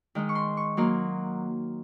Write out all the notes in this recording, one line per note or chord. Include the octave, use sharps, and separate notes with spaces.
D#3 G#3 D#4
C#6
C6
C#6
F#3 A#3 D#4 C6